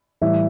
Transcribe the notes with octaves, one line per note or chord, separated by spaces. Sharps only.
A2 E3 G3 E5